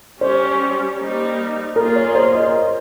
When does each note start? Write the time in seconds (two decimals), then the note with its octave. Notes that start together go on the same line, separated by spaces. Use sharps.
0.21 G3 C#4 G4 C5
0.98 G3 A#3 D#4
1.75 A#3 F4 G#4 A#4
1.95 C#5
2.15 C5
2.34 D#5